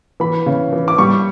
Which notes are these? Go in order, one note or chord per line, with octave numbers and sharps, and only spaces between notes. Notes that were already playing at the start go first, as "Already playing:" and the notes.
E3 B5
C#3
E3
D6
G3 C#6